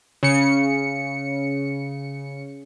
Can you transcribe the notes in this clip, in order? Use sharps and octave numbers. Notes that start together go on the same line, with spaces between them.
C#3 C#7